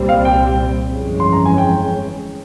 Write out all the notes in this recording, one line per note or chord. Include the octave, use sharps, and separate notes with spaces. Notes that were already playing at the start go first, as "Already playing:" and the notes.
Already playing: C2 A#2 G3 C4
F5
G5
G1 F2 E3 G#3 C#4
C6
A#5
G#5
G5